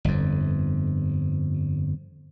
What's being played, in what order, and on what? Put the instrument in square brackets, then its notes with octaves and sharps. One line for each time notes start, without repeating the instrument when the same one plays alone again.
[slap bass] G1 F2